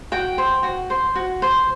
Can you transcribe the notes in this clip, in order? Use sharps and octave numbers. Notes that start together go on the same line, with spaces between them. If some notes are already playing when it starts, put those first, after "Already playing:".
F#4 G5
C5
F#4
C5
F#4
C5